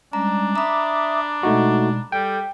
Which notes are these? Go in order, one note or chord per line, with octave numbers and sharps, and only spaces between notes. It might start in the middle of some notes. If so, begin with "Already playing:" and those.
G3 G#3 C#4 D4 A#5
E5 A#5 B5 D6 D#6
B2 G#3 A3 D#4 F#4
G3 A4 G5